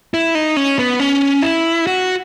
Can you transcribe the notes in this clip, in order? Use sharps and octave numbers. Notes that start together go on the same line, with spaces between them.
E4
D#4
C#4
B3
C#4
E4
F#4